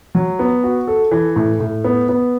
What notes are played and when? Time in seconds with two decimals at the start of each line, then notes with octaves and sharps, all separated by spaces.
0.15 F#3
0.39 B3
0.63 F#4
0.87 A4
1.11 E3
1.36 A2
1.60 A2
1.84 B3
2.09 B3